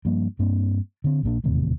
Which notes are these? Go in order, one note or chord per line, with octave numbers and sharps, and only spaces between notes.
G2 F3 A#3
G2 A#3 C4 D4
D3 C4
A#1 A#2 D4
E1 D#2 A2 C3